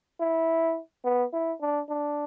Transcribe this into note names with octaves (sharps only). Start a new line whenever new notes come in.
E4
B3
E4
D4
D4